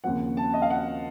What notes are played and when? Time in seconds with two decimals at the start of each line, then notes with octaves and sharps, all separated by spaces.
0.04 D#2 C#3 F3 C4 F#5
0.37 A5
0.54 D#5
0.62 F5
0.70 F#5